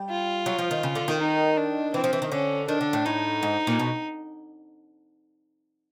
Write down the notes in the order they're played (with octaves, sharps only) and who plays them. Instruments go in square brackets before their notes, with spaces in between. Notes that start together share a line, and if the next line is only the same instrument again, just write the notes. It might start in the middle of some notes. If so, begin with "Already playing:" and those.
Already playing: [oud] G3
[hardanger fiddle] F4
[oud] F#3
F3
D#3
C#3
D3
D#3
[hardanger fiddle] D#4
D4
[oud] E3 [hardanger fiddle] C4
[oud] F3
E3
D#3
[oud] D3 [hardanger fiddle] C#4
[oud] D#3 [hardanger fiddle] D4
[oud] D3
A2
[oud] A2 [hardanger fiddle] D#4
[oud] G#2
A#2
B2